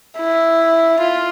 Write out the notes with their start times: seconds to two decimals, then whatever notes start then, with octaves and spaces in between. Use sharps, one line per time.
0.17 E4
0.99 F4